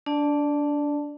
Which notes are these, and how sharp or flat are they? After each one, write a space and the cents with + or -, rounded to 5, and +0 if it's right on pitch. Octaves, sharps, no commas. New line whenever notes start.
D4 -20 D5 +10 A5 +0